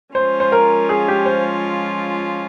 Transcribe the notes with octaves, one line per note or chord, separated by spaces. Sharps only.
F3 G#3 C#4 F4 C5
C5
A#4
G#4
G4
C5